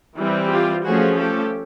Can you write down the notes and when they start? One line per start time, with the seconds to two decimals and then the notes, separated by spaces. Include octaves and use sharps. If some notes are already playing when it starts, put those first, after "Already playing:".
0.16 E3 G3 C4
0.50 F4 G4
0.85 F3 A3 C#4 F#4 G#4
1.19 G4 A4